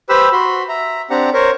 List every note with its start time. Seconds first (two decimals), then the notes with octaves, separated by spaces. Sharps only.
0.09 G4 B4 C5 B5 E6
0.32 F#4 B5 C6
0.69 E5 A#5
1.10 C4 D4 G4 F#5 A#5
1.33 A#4 C5 C#5